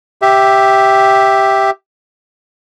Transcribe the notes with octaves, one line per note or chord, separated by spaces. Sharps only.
G4 E5